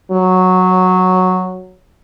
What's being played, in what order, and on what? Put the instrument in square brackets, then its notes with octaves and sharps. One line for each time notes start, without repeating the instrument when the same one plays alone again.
[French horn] F#3